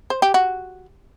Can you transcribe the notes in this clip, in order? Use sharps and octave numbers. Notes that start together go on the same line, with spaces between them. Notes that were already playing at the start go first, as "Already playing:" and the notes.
C5
G4
F#4